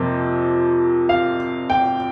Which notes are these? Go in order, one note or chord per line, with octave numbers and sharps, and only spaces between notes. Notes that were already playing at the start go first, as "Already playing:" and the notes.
Already playing: F2 C3 F3 A#3
F5
G5